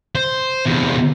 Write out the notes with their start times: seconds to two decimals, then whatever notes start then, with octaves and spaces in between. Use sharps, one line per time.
0.15 C5
0.65 E2 C3